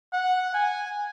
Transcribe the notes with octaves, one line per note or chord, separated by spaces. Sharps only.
F#5
G#5